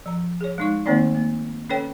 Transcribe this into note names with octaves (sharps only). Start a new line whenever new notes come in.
F3 A#5
G#4 C#5
G#3 D#4 C#6
D#3 A3 A#3 C4 D#4 D5
A#3
C#4 A4 B4 C#5 G5